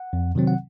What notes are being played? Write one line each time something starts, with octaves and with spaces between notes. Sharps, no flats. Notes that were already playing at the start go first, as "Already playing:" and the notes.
Already playing: F#5
F2
C3 D#3 F#3 C4
F#5